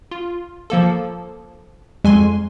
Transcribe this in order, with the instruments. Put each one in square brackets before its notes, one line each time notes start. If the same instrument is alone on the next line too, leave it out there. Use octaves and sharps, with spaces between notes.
[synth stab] F4
F3 A#3 A4
[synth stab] F2 G#5 C6 [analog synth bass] G#3